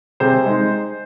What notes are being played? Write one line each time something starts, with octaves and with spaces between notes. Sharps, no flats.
C3 G#4 C5
G#3 D#4